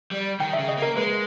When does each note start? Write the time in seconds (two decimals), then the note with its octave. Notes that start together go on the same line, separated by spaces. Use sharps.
0.11 G3
0.40 D#3 G5
0.53 E5
0.59 C#3
0.69 D#5
0.78 A#3 A#4
0.97 G#3 B4